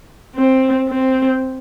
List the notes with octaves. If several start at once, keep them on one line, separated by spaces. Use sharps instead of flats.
C4
C4